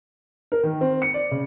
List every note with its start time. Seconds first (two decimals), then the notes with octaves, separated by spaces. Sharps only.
0.52 A#4
0.63 D#3
0.81 C4
1.02 C#7
1.14 D5
1.31 C#3